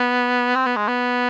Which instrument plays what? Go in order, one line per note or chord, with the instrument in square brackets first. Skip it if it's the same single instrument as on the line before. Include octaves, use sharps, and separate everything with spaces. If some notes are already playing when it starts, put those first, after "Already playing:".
Already playing: [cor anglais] B3
C4
B3
G#3
B3